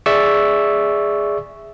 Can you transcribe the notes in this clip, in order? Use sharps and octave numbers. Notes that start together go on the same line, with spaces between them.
G#4 D5 E5 C#6 E6